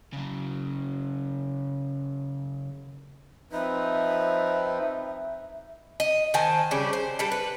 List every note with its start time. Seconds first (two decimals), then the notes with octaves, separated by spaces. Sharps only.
0.13 C#3 F#3
3.52 F3 C4 D#4 B4 E5
6.00 D#5
6.34 D#3 C5 G#5 A5
6.71 C#3 G3 C#4 D4
6.93 C5
7.19 G3 D4 A4
7.32 B4